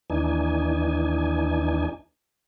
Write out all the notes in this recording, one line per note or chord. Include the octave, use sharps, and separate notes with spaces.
D#2 E3 D4 D#4 G#5